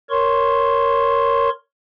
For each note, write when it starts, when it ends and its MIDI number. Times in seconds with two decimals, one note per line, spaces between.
0.10 1.50 70
0.10 1.50 73
0.10 1.50 84
0.10 1.50 85